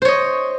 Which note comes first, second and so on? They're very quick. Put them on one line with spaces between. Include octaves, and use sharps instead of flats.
C5 C#5 D#5